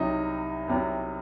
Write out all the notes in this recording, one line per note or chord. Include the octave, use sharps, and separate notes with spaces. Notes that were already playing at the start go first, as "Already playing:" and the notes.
Already playing: C2 C3 F#3 D#4
C2 C3 F#3